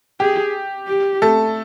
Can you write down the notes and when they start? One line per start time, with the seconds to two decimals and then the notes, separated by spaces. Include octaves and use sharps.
0.20 G4 G#4
0.88 G4
1.22 A3 A4